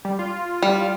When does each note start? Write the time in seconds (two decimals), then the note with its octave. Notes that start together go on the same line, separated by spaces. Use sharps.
0.05 G3
0.19 F4
0.62 G3